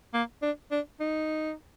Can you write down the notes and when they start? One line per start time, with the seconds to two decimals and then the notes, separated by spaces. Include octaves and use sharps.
0.14 A#3
0.42 D4
0.71 D4
1.00 D#4